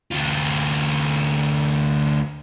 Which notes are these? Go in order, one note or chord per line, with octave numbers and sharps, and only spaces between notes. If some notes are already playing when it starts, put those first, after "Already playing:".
D2 F4